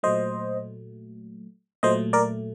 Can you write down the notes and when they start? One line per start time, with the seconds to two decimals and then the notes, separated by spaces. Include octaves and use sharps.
0.03 A#2 F#3 A3 C5 D#5
1.83 A#2 F#3 A3 C5 D#5
2.13 A#4 D5